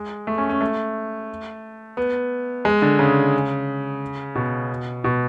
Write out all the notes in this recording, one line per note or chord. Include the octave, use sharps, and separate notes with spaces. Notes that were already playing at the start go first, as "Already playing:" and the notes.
Already playing: G#3
A3
C#4
C#4
A3
B3
G#3
D3
C#3
B2
B2